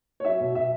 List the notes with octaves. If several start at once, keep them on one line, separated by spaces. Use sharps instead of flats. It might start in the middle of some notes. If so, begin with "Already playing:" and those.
C#5
F#3 E5
B2
B2 E5